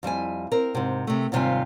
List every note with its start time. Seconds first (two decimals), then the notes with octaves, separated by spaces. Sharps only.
0.03 F2 G3 E4 G#5
0.52 C4 A#4
0.75 G#2 C3
1.07 C3 A3
1.32 D#2 G#2 C3 G3 F4 G#5